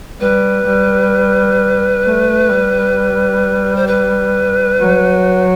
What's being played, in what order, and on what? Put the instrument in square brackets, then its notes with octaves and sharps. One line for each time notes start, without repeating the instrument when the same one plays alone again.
[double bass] G3 [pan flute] B4
[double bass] G3
A3
G3
[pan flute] C5
B4
[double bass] F#3